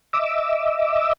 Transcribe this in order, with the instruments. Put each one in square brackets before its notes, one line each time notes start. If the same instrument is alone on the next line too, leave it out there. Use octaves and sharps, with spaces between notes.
[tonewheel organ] D#5 E5 D6 E6